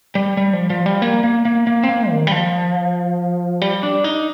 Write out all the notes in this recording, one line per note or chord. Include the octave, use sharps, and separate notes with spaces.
G3
G3
F3
F3
G3
A#3
A#3
A#3
A#3
C4
A#3
D#3
G3
F3
G3
D4
D#4